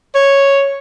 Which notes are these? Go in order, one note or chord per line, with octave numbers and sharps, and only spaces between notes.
C#5